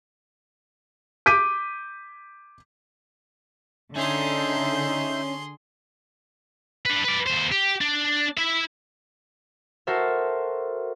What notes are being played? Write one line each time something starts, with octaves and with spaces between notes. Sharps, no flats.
D6 G6 B6 D#7
D3 C#4 D#4 G#4 E5 C6 G6
D4 B4
B4 D5
D#2 C5
G4
D4
E4 E5
F#4 A4 A#4 C5 E5